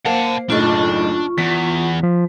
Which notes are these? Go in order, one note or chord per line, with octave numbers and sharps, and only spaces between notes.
A#3 C5 F#5 A5
F#1 B1 A2 D4 F4 C#6
E2 B6
F3